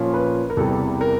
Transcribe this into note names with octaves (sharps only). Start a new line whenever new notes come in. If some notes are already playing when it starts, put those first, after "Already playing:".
Already playing: A#2 F3 A#3 C#4
B4
A#4
E2 C3 E3 G3 A4
A#4